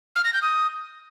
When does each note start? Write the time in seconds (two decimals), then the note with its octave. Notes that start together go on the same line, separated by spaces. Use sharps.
0.16 F6
0.24 A#6
0.33 G6
0.42 D#6